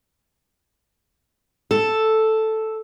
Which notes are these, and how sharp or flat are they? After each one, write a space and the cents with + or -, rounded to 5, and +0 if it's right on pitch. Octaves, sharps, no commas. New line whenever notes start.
A4 +0